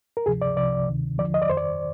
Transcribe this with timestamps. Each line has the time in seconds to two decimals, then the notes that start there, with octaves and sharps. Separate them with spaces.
0.17 A#4
0.26 D2 C3 F3 G#4
0.42 D5
0.57 C2 C3 F3 D5
0.88 D2 C3 D#3
1.18 D#2 D3 F3 D5
1.34 D#5
1.42 D5
1.49 F2 D#3 C5
1.57 D5